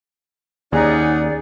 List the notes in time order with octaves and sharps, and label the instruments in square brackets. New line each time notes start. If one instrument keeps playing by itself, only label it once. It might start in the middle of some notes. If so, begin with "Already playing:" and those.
[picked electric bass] D#2 [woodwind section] C#4 D#4 F#5 [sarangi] G#4 [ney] D5